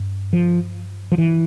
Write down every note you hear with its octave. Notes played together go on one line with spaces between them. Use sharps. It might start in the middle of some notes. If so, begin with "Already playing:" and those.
Already playing: G2
F3
F3
E3